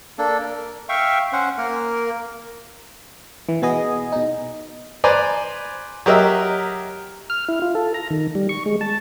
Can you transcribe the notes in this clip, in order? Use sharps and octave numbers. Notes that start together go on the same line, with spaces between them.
A#3 D4 A4
A#4
E5 F5 G5 C#6
C#4 C5 F#5
A#3 A#4
E3
B2 B3 G#4 D#5
B2 D#4
B4 C5 D5 G#5 A#5 B5
F#3 G4 A#4 D#5 E5
F6
E4
F4
A4
A#5
D#3
G3
C#6
G#3
A5